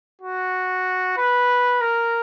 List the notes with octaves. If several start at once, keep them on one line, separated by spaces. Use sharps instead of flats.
F#4
B4
A#4